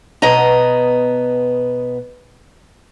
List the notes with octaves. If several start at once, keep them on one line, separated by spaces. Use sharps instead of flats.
B2 B3 D#5 A#5